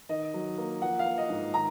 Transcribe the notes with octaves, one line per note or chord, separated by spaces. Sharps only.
D#3 D#5
F#3
A#3
F3 F#5
F5
A#3
D#5
G#2
D#3 A#5